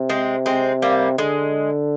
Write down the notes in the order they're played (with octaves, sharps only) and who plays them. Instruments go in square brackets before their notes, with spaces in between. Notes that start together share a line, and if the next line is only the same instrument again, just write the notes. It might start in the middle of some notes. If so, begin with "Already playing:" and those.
Already playing: [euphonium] C3
[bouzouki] G#3 C4
G#3 C4
G3 A#3
[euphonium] D3 [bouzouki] G#3